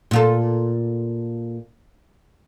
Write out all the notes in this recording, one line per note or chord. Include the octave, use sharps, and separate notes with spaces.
A#2 F4 A4